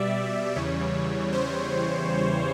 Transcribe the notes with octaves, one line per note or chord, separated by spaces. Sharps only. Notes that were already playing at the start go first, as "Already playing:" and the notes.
Already playing: B2 G3 D5 E5
E2 C#3 E3 G3 C#5
C5